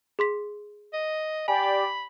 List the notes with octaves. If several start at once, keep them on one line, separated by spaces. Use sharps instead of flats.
G#4 C6 B6
D#5
G4 D5 G5 G#5 B5